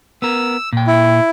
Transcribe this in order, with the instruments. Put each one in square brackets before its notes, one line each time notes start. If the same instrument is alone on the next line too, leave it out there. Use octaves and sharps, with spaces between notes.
[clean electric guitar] B3 A#4 [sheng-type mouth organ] E6
[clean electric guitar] A#2 G5
[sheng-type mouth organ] E4